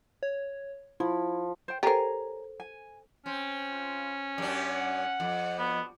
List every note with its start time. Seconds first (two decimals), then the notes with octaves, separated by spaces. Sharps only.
0.23 C#5
1.00 F3 E4
1.68 C5 G5
1.83 G4 A4 A#4 C5 C#5 G#5 A#5
2.60 G#5
3.26 C4 C#4
3.72 F4
4.38 F#2 D4 G4
4.69 F#5
5.20 F2
5.59 G3 B3 D4 F#4